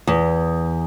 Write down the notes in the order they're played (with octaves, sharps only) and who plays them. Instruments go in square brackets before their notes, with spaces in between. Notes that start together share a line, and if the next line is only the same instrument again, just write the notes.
[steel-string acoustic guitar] E2